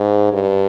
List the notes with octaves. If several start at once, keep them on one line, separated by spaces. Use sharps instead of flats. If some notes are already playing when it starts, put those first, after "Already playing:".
Already playing: G#2
G2